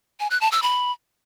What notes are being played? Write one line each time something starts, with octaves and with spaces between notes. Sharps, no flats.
G#5
F#6
A5
E6
B5